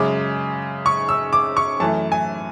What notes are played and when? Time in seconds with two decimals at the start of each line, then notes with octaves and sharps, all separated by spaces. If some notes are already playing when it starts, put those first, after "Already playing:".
Already playing: F#2 C#3 G#3 D6
0.86 C#6
1.09 E6
1.33 D6
1.57 C#6
1.80 F#2 E3 A3 A5
2.12 G#5